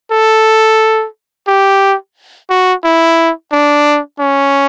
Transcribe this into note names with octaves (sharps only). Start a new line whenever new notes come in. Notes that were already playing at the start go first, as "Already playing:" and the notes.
A4
G4
F#4
E4
D4
C#4